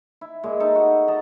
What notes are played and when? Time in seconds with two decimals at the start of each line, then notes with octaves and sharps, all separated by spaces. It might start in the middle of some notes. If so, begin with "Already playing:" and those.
0.21 E4
0.43 A#2 G#3
0.60 D#4 A4
0.75 F#4
1.08 D#5 A5 A#5